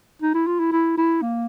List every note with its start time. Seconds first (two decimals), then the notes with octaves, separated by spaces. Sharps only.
0.22 D#4
0.34 E4
0.47 F4
0.59 E4
0.72 E4
0.97 E4
1.22 A#3